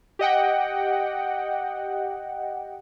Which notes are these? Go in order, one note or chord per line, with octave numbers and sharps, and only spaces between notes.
G4 D#5 F#5 G5